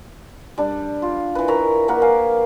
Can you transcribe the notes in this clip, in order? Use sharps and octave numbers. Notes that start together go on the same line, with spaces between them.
G3 D4
F4
E3 B4
A#4 C#5 E5 A#5
A#3 A#4 B4 F#5
F5 G#5